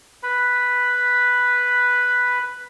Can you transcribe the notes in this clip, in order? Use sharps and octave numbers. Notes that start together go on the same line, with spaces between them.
B4 B5